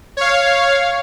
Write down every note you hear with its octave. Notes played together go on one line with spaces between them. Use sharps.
C#5 F5